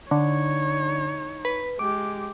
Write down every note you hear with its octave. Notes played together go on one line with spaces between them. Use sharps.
D3 D#4 C#5
B4
G#3 G4 D6